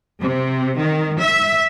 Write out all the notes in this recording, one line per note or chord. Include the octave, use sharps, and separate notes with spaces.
C3
D#3
E5